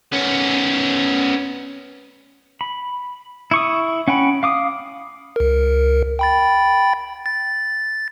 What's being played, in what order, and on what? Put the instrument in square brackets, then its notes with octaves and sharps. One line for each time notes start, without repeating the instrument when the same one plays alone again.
[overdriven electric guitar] B3 C#4
[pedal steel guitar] B5
E4 C#6 D#6
C#4 F#5 G5 B5
F5 D6 D#6
[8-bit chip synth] C#2 A#4
G5 B5 A6
A6